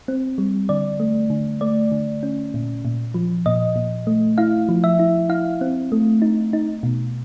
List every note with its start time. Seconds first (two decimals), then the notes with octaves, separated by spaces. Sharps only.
0.08 C4
0.38 G3
0.69 D3 D5
1.00 A3
1.30 D3
1.61 A3 D5
1.92 D3
2.23 C#4
2.54 A#2
2.85 A#2
3.14 F3
3.46 A#2 D#5
3.76 A#2
4.07 A3
4.38 E4 F5
4.69 F3
4.84 E5
4.99 E4
5.29 E4 F5
5.61 C4
5.92 A3
6.22 D#4
6.53 D#4
6.83 B2